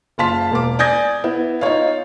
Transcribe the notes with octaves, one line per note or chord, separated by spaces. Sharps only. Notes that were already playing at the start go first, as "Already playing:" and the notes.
F#1 F4 F5 A5 C6 B6
E1 A#3 D6
D5 G#5 D#6 G6 G#6 A#6
B3 E4
D#4 F4 C#5 F5